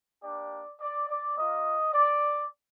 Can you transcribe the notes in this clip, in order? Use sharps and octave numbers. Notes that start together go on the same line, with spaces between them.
A#3 D4 G4 D5
D5
D5
A#3 F4 D#5
D5